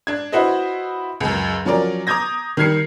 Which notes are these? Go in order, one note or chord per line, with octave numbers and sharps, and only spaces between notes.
D4 G#6
E4 F#4 B4 C5 D#5
C#2 F#2
F3 F#3 C#4 A#4 D5
A#5 D6 D#6 G6 G#6 A#6
D#3 G3 F6 G#6 C7 C#7